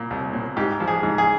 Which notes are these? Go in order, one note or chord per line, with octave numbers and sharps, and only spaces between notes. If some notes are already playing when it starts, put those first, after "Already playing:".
Already playing: A#2
C2
A#2
G#2 G4
F3
G#4
G#2
G#4